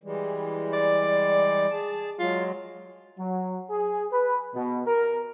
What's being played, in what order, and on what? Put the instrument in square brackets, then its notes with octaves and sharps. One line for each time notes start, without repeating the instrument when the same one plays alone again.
[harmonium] E3 G3 G#3
[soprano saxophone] D5
[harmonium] G#4 A5
[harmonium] F#3 G#3 [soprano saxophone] F4
[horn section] F#3
G#4
B4
B2
A#4